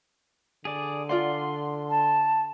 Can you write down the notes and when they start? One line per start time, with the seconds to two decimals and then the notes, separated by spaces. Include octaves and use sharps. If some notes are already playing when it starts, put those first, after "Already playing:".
0.65 D3 G#4 D5
1.09 F4 D5 F#5 C6
1.90 A5